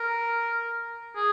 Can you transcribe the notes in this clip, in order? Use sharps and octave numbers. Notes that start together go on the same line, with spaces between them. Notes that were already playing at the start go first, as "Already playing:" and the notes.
Already playing: A#4
G#4